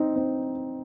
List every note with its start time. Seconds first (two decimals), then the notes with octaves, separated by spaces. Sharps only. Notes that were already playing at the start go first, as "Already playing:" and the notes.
Already playing: C4 D#4
0.16 C4